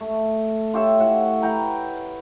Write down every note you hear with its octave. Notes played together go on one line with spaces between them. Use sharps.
A3
F4 G4 C#5 E5
A2 F#5
B4 F#5 G5 A#5